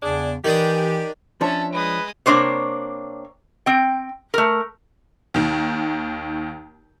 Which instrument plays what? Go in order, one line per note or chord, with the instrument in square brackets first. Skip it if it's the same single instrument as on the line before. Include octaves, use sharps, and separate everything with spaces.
[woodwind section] E2 C#3 [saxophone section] D4 G#4
[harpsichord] D#3 D4 D#6 [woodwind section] E3 [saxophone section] G4
[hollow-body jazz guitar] F3 D4 C#5 [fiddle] C#4 E5 [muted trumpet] A5
[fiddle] G#3 D#6 [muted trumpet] B4
[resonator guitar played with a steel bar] C3 A#3 D4 C5 C#5
C4 G5
A3 A#4
[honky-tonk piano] D#2 D#3